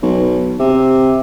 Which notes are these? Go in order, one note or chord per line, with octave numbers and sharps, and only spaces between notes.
B1
C3